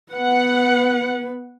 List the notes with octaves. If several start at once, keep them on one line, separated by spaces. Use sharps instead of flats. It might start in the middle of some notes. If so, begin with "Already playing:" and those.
B3 B4 F#5